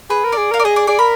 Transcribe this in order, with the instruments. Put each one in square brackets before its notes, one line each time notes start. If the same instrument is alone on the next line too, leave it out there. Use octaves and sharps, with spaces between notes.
[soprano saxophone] G#4 [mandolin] B4
[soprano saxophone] A#4
[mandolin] D5
[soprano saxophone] G#4
[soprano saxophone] A#4 [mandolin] F5
[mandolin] D5
[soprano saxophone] G#4 [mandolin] D#5
[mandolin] D5
[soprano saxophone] G#4 [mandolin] D5
[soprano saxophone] A#4 [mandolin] B5